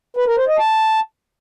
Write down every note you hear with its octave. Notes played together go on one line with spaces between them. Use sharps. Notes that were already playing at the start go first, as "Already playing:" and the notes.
B4
A#4
C5
D#5
A5